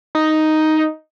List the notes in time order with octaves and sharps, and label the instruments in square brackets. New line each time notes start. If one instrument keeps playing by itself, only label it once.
[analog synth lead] D#4